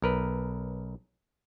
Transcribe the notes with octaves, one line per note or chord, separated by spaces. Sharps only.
B1 A#4 B4